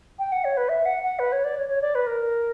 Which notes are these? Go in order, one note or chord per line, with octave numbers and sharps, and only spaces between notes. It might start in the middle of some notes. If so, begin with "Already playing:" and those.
G5
F#5
C#5
B4
E5
F#5
F#5
B4
C#5
D5
C#5
C#5
D5
B4
A#4